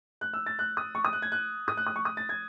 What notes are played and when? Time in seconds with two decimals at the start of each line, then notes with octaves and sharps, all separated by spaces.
0.21 F#6
0.34 E6
0.46 A6
0.59 F#6
0.77 D#6
0.95 C#6
1.05 D#6
1.13 F#6
1.22 G#6
1.32 F#6
1.68 D#6
1.77 F#6
1.86 D#6
1.96 C#6
2.05 D#6
2.17 A6
2.29 G#6